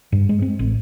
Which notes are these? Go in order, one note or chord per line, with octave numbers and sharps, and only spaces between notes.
G2
G#3
C4
A1